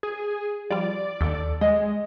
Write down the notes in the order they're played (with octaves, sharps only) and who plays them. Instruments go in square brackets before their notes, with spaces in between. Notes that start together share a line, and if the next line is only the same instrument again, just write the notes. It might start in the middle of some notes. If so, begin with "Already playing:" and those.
[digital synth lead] G#4
[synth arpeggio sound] F3 G3 F4 [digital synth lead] D5
[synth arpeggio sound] D#2 [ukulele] A4 A5
[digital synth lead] G#3 [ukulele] D#5